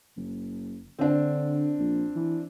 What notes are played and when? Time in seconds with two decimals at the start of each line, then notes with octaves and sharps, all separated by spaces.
0.16 F#1
0.99 D3 C4 D4
1.79 A#1
2.16 E3